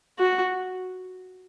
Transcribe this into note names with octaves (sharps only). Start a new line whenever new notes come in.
F#4